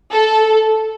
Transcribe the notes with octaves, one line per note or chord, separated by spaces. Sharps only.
A4